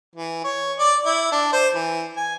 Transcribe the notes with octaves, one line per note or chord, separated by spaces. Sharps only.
E3
C#5
D5
E4
D4
C5
E3
G#5